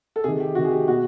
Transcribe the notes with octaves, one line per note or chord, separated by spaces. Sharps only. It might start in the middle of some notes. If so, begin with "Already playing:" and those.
A4
C3 D#3 G#4
G4
C3 D#3 F#4
G#4
G4
B2 F#4